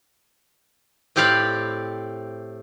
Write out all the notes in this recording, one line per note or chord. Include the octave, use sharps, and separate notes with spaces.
A2 C4 G4 D5 F5 B5